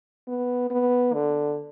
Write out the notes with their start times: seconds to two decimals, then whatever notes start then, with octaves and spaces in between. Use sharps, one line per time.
0.28 B3
0.70 B3
1.13 D3